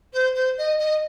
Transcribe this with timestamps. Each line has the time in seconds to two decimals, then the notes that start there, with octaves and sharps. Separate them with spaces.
0.13 C5
0.34 C5
0.57 D#5
0.79 D#5